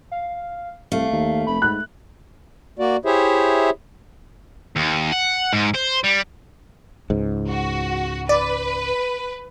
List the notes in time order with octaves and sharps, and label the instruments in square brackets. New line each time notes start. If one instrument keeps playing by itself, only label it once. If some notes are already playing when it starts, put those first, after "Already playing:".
[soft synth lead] F5
[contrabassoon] C2 [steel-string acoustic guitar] A3 [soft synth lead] F5
[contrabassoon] D#2
[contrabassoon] F1 [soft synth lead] B5
[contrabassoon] G#2 [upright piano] F#6
[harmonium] A#3 F#4 D5
E4 G4 G#4 C5 C#5 E5
[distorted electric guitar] D#2
F#5
G#2
C5
G3
[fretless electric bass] C#2 G#2
[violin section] F#4
[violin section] B4 [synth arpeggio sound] D5